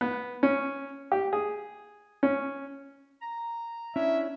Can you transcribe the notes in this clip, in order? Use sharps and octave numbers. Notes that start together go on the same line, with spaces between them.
B3
C#4
G4
G#4
C#4
A#5
C#4 D4 E4 E5